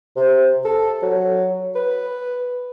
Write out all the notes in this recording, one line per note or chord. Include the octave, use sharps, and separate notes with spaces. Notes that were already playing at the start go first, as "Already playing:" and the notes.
C3
A4
F#3
B4